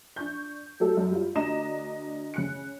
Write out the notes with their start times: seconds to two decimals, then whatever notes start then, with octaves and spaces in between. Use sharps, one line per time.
0.16 D4 C#6 G6
0.80 F#3 A3 G4 A4
0.97 F#2
1.10 G3 F4
1.35 D2 D4 D#5 A#5 E7
2.34 C#3 F#6 C#7